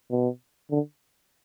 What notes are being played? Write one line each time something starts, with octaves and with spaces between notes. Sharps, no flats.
B2
D3